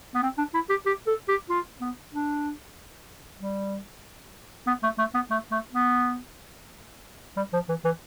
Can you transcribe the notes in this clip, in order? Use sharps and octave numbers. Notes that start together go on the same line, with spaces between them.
B3
C4
D4
E4
G4
G4
A4
G4
F4
B3
D4
G3
B3
A3
A3
B3
A3
A3
B3
G3
F3
E3
E3